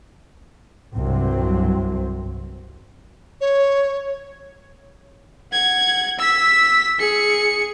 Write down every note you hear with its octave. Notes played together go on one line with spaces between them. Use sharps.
C2 G2 F#3 C4
C#5
F#5 G#6
E6 B6
G#4 C#7